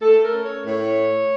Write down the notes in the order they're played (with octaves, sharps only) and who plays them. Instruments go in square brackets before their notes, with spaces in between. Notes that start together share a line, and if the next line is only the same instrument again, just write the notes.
[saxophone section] A3 A4
A#4
C#4
C#5
A2 C#5